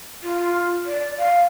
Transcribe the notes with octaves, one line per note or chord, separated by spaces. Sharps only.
F4
D5
F5